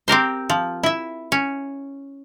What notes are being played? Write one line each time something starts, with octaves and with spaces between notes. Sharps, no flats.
C4 G4 A#4 C5
F3
E4 E5
C#4